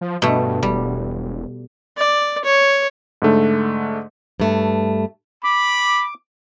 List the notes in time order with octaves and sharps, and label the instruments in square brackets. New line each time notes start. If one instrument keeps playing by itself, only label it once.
[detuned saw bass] F3
[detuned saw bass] G2 [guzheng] B2 A3
[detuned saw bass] E1 [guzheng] G3
[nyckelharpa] D5
C#5
[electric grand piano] G#2 D3 A3
[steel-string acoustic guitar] G2 A3
[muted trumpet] B5 [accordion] D6